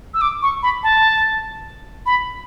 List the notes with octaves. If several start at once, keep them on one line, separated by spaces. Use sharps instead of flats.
E6
D6
C#6
B5
A5
B5